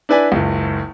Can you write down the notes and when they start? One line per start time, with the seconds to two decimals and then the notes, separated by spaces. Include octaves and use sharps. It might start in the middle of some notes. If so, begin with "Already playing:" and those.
0.09 D4 E4 B4 D5 G#5
0.32 F#1 C#2